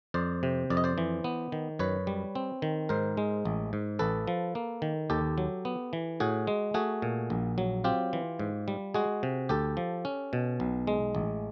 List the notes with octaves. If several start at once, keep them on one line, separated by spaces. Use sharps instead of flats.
F2 C5 D5
C3
F2 D5
D#5
C5 D5
E3
B3
D#3
F#2 B4 C#5
G3
C4
D#3
G#2 A#4 C5
G#3
A1
G#2
A1 A4 B4
F3
A#3
D#3
D#2 G4 A4
F#3
B3
E3
A2 F#4 G#4
G#3
A3 F#4 G#4
A#2
A#1
F#3
C4 F4 G4
E3
G#2
G3
G#3 F#4 G#4
C3
D2 G4 A4
F3
C#4
B2
B1
G#3
A1